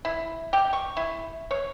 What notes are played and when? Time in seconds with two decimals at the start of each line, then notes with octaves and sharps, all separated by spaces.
0.05 E4
0.53 G4
0.73 C#6
0.97 E4
1.51 C#5